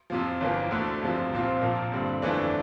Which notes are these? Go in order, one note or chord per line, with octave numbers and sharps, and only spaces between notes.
F2 C3 F3
G1 F2 E3 A#3
D2 D3 A3 D4
G1 F2 C3 F3
C2 A#2 F3 C4 F4
A#1 A#2 F3 A#3
G2 D3 G3 C4
G1 F2 E3 A3 D4